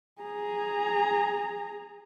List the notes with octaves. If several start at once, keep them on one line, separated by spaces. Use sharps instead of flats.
G#4 A#5